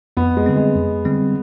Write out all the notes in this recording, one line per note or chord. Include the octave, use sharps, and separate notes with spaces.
F2 B3
G#3
D3 G3 C4
G#3
F2
D3 G3 C4